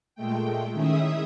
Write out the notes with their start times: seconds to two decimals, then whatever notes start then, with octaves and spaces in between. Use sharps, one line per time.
0.15 A#2 G#3 A3 G5
0.73 D#3 C#4 E4 G#4 E5 D#6